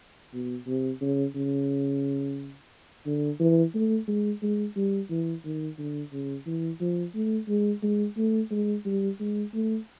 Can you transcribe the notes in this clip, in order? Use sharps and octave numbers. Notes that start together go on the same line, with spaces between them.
B2
C3
C#3
C#3
D3
E3
A3
G#3
G#3
G3
E3
D#3
D3
C#3
E3
F3
A3
G#3
G#3
A3
G#3
G3
G#3
A3